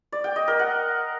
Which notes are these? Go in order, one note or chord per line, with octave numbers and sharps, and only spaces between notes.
D5
G5
D#5
A#4
F#5